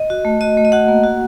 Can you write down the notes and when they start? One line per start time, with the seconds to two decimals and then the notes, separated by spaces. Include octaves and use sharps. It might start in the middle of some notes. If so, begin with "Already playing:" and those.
Already playing: D#5
0.10 F#4
0.25 A3
0.41 F#4 D#5
0.57 A3
0.65 D#5
0.72 F#4 F#5
0.88 A#3
1.04 F#4